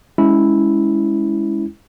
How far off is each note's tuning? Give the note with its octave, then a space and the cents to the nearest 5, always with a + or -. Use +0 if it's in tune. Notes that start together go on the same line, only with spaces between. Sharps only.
G#3 +0 C#4 +20 E4 -5